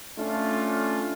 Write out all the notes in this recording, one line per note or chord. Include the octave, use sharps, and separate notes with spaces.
A3 C#4 D4 F4